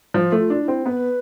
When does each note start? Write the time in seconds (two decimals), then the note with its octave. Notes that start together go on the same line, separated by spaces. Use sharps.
0.14 F3 F4
0.32 A3
0.38 F4
0.50 D4
0.62 E4
0.68 C4
0.85 B3 B4